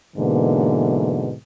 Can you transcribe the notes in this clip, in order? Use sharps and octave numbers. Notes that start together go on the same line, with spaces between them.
G#2 B2 D3 E3 A#3